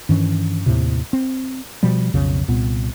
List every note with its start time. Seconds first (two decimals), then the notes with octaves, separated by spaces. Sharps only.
0.09 G2 D#3 E3 C#4
0.66 D#2 A2 C3
1.13 C4
1.83 B2 F3 G3
2.14 B1 F2 C#3
2.48 C2 A#2 B3